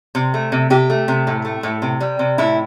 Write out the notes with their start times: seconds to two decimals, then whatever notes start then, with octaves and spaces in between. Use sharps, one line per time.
0.15 C3
0.34 A3
0.52 C3
0.70 C3 G4
0.90 A3
1.08 C3
1.27 A2
1.45 A3
1.63 A2
1.82 C3
2.01 G3
2.19 C3
2.38 A2 E4